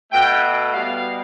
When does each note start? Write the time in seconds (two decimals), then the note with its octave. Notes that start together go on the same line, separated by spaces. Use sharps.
0.11 B2 A3 G5
0.72 B2 G3 B3 F5